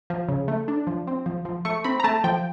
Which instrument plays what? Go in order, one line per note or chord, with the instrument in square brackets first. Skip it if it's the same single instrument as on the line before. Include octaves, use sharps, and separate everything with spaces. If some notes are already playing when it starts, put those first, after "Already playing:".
[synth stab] F3
C#3
A3
D4
F3
C4
F3
F3
A3 C#6
C4 B5
A#5
A3 A5
F3 G5